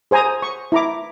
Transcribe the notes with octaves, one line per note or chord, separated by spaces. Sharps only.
G#4 C5 G#5 A#5 D#6
C#6
E4 A#5 D6